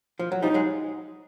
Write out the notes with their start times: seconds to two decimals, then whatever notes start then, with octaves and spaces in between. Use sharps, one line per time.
0.19 F3
0.32 F#3
0.42 F3 G3 D#4
0.54 F#3 G#3